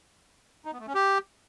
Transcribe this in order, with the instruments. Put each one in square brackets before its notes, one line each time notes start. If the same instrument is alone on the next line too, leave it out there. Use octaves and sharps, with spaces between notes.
[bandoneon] D#4
B3
A3
C#4
G4